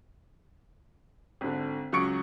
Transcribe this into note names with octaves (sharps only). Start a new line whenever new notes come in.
G#1 D3
C#2 F#3 C#4 C#6 C#7 D7